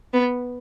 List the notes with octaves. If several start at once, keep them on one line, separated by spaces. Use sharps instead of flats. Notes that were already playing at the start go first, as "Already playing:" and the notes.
B3